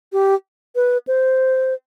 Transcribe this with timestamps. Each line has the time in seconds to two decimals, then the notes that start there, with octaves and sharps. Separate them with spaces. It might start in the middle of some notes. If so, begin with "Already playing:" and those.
0.13 G4
0.75 B4
1.07 C5